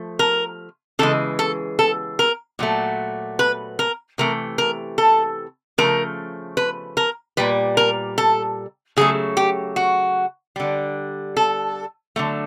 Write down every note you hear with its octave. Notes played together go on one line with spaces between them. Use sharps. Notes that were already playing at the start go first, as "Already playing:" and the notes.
Already playing: F3 A3
A#4
C#3 E3 G#3 A4
A4
A4
A#4
A#2 F#3 A3
B4
A#4
C3 E3 A3 A#4
A#4
A4
C#3 F3 A3 A#4
B4
A#4
A#2 G3 B4
A#4
A4
C#3 F#3 A3 G#4
G4
F#4
D3 G3
A4
D3 F#3 A3